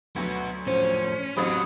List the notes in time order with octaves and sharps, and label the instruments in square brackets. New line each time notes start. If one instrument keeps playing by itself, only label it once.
[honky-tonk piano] D2 F#3 [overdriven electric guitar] B3 F#4
[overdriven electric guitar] A2 F3 [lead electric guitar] C#4 [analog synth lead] C5
[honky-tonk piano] A1 C4 B5 [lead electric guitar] F#3 [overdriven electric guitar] G4 F5 [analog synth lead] D#6